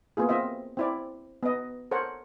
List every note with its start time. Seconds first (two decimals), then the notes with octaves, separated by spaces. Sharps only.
0.17 A#3 B3 F4 G#4
0.29 C4 F4 D#5 E5
0.77 C4 E4 D5
1.43 B3 D#5
1.91 A4 A#4 C5 C#5 F#5